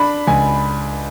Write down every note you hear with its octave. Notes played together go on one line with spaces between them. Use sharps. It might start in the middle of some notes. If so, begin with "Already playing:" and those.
Already playing: D4 B5
C#2 G#5